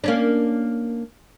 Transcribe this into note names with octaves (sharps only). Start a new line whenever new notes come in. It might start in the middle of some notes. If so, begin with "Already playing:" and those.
A#3 C#4 D4